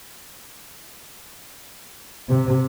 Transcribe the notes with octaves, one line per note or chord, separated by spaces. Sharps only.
C3